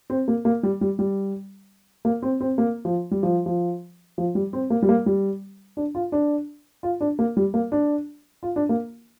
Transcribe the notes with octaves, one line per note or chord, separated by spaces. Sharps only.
C4
A#3
A#3
G3
G3
G3
A#3
C4
C4
A#3
F3
G3
F3
F3
F3
G3
C4
A#3
G3
A#3
G3
D4
F4
D4
F4
D4
A#3
G3
A#3
D4
F4
D4
A#3